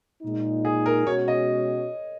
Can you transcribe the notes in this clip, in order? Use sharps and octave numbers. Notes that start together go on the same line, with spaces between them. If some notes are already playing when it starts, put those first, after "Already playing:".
A#2 G#3 D#4
G#4
A#4
B2 G#3 C#4 F#4 C#5
D#5